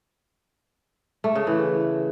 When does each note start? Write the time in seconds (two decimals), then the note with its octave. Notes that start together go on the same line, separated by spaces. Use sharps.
1.24 A3
1.35 C#3
1.47 E3